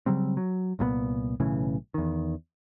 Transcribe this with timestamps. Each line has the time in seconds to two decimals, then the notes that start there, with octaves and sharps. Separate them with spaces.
0.06 C#3 F#3 G3 C4
0.37 F#3
0.79 C2 A#2 F3 B3
1.40 B1 A2 C#3 E3
1.94 E2 D#3